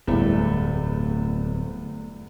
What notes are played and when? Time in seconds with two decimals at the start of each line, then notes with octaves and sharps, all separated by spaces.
0.07 D1 E2 G2 A3